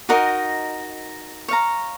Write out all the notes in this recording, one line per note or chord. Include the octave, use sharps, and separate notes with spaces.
D#4 F#4 A#4 D#5
C#5 F5 A#5